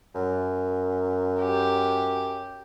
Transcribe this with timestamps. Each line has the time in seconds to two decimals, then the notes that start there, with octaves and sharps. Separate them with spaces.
0.15 F#2
1.40 G4